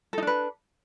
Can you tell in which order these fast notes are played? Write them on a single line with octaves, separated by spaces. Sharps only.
A4 D#4 D4 B4